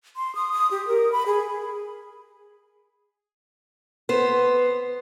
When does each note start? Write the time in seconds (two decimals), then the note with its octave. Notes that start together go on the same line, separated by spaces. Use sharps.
0.16 C6
0.35 D#6
0.52 D#6
0.71 G4
0.87 A#4
1.12 B5
1.26 G#4
4.09 B3 C5